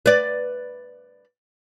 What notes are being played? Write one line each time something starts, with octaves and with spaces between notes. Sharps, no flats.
B4 D5